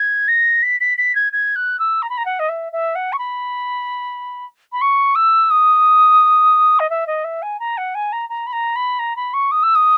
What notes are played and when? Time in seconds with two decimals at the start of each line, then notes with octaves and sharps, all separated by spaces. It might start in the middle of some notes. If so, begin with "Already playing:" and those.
Already playing: G#6
0.28 A#6
0.62 B6
0.80 B6
0.98 B6
1.15 G#6
1.32 G#6
1.55 F#6
1.79 E6
2.02 A#5
2.09 B5
2.17 A#5
2.25 F#5
2.39 D#5
2.49 E5
2.72 E5
2.95 F#5
3.12 C#6
3.18 B5
4.72 B5
4.81 C#6
5.15 E6
5.50 D#6
6.79 D#5
6.90 E5
7.07 D#5
7.24 E5
7.42 G#5
7.59 A#5
7.77 F#5
7.95 G#5
8.12 A#5
8.29 A#5
8.46 B5
8.52 A#5
8.76 B5
8.99 A#5
9.16 B5
9.33 C#6
9.51 D#6
9.63 E6
9.75 D#6